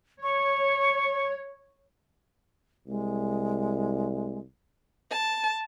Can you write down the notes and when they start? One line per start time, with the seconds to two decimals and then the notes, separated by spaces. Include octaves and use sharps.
0.23 C#5 C#6
2.87 C2 G#3
5.11 A5